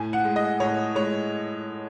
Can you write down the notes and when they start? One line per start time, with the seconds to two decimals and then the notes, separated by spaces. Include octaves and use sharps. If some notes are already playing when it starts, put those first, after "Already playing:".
Already playing: A2 G#5
0.13 F#5
0.25 G#3
0.36 D#5
0.60 A2 C#5
0.95 G#3 C#5